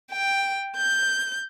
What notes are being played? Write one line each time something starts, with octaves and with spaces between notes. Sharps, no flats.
G5
G6